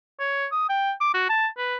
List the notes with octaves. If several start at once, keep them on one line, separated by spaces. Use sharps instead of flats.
C#5
D#6
G5
D6
F#4
A5
B4